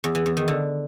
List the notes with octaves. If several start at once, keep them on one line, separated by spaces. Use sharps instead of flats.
E2
E3
E2
D#3
D3